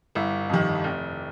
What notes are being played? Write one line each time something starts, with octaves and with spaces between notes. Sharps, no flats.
G1 E4
F2 C3 D#3
F1